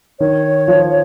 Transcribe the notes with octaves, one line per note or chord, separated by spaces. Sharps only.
D#3 C#5
F3